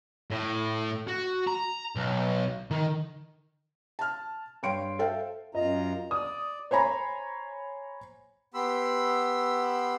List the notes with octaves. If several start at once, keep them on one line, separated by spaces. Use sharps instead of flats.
A2
F#4
A#5
B1
D#3
A5 F6
G2 C#5 F5 G5 C6 D7
A4 C5 E5 F5 G5
F#2 F4 D#5 A#5
D5 D#6
C5 C#5 G#5 A#5 B5
B3 G4 B5 C6 E6